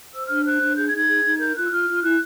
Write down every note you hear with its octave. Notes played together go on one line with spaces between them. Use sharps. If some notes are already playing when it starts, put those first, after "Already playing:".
C5 E6
D4 F6
C5 F#6
D4
G#4 G6
G#6
D#4
G#6
G#4
D#4
A#4 G6
F4 F#6
E6
F4 F6
F4
E4 F#6